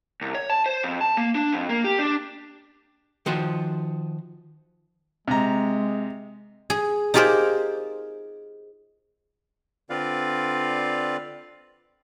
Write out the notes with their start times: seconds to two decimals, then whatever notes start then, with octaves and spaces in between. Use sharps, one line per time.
0.21 C2
0.35 C#5
0.50 A5
0.66 C5
0.84 F2
1.01 A5
1.17 A#3
1.35 D4
1.52 F2
1.69 A#3
1.84 G4
1.99 D4
3.26 D#3 F3 F#4 C5
5.28 C3 G#3 A#5
6.70 G#4
7.14 D#4 F4 G4 G#4 A#4 C5
9.90 D3 C4 F4 B4 D5 F5